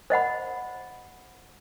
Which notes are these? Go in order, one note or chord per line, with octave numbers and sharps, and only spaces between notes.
C5 D#5 F#5 B5